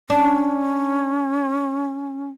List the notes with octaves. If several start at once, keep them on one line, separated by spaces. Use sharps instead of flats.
C#4 D4